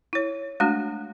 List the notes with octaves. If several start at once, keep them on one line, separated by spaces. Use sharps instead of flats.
E4 C#5
G#3 A3 D4 F#4